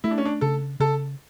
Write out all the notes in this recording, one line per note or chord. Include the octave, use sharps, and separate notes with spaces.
A3 E4
D4
C#4
D4
C#3 A4
C#3 A4